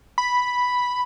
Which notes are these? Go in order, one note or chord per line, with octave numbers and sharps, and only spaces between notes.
B5